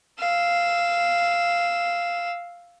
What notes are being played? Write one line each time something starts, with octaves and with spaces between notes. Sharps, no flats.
F5 E6